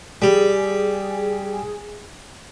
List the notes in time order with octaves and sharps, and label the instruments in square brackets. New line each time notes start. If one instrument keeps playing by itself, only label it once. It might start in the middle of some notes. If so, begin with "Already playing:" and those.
[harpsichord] G3 [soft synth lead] G#4